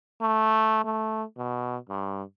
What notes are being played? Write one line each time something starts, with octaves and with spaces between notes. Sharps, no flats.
A3
A3
B2
G2